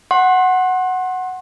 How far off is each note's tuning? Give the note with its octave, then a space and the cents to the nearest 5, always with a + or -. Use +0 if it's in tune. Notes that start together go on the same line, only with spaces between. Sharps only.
F#5 +0 C6 +30